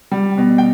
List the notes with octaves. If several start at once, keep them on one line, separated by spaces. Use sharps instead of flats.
G3
B2
G5